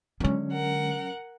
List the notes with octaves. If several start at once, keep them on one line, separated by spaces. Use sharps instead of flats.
D3 F#3 G#3 C#4
A#4 F#5